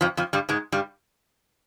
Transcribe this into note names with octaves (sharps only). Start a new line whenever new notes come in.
F2 F3
F2 F3
G2 G3
G#2 G#3
G2 G3